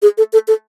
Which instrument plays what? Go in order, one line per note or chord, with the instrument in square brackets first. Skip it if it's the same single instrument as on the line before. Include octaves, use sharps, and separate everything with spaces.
[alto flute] G#4
A4
A4
A4